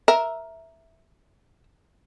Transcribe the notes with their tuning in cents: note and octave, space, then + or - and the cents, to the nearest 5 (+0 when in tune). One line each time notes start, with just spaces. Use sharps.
A#4 +5 E5 +0